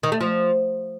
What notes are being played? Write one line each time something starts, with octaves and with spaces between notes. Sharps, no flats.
D#3
A3
F3